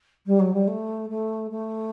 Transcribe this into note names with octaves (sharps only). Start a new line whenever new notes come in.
G3
F#3
G3
A3
A3
A3